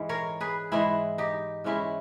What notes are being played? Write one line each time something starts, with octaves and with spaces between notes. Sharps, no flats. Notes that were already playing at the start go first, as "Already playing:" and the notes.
Already playing: G#2 E3 G#3
A#4 C#5
G#4 B4
G#2 E3 G#3 E4 G#4
D#4 G4
G#2 E3 G#3 C#4 E4